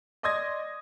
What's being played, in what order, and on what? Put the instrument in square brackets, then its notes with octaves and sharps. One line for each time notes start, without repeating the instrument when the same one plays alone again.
[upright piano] D5 D#5 C6 D#6 G#6 A#6